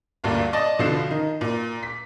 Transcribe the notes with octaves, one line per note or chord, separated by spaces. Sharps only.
D2 G2 A#2 A#3 D5
D5 D#5 A5 A#6
B1 B2 D3 F3 C7 E7
D#3 D#4
A#2
B6